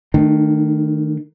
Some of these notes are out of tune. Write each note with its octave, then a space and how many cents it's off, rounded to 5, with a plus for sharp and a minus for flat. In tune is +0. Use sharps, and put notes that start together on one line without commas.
D#3 +0 A3 +15 D4 +40